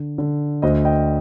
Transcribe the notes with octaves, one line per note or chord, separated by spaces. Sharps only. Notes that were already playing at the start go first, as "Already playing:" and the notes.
Already playing: D3
D3
D2 C5 D#5
D#5 G5